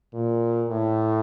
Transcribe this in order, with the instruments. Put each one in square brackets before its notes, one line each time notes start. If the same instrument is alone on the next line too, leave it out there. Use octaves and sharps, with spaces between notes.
[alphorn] A#2
A2